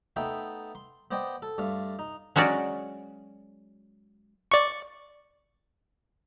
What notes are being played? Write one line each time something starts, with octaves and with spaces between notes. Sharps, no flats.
A3 B3 D#4 E5 G5
C6
B3 C5 D5 D#5 G5
A4
G2 A3 F5
D#4
F#3 G#3 C#4 F#4 D5
D5 C#6